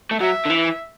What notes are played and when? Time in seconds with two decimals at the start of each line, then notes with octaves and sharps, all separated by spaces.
0.11 A3
0.20 F#3 E5
0.45 D3
0.50 E3